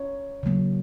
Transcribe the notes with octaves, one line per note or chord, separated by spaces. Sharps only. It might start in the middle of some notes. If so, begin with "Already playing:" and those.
Already playing: C#5
C#3 F#3 A#3